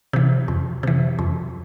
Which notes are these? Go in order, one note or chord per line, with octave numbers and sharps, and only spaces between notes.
C3 E3
F2
C3 E3
F2